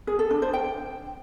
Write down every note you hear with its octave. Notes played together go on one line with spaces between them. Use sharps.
G#4
A4
D4
C5
G5